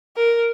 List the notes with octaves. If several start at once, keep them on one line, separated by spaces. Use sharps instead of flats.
A#4